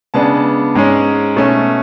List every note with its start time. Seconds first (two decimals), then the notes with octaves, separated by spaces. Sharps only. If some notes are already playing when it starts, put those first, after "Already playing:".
0.14 C#3 G#3 B3 D4 A5
0.75 G#2 G#3 C#4
1.36 B2 A3 C#4